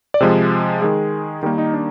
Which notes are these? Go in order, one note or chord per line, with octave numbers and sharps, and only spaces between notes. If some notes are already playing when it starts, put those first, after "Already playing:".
D5
C3 F3 G#3 C5
D#3 G#3 G#4
D#3 G3 A#3 G4
D#4
D4